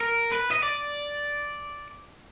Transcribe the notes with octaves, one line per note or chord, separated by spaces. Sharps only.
A#4
B4
D#5
D5